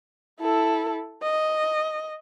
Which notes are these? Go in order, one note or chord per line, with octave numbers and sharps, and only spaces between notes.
E4 A4
D#5